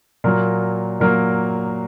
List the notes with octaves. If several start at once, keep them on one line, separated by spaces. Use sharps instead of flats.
A#2 F#3 A#3 A#4
A#2 F#3 A#3 A#4